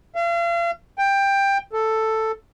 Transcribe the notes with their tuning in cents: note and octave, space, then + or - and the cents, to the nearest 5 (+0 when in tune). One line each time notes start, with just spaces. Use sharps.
F5 -40
G5 +15
A4 +5